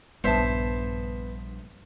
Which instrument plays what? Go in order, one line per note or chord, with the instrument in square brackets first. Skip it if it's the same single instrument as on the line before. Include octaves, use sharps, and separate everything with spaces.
[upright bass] A#1 G3 [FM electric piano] G2 [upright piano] B3 A5 [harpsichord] C5 E5